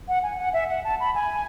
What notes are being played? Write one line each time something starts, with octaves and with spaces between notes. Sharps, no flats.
F#5
G#5
F#5
E5
F#5
A5
B5
G#5